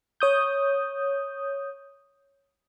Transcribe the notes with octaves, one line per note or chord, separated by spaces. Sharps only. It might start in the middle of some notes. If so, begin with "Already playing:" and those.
C#5 D#6 G6